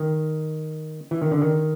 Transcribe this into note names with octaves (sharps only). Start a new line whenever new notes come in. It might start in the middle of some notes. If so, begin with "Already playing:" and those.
Already playing: D#3
E3
D#3
D3
D#3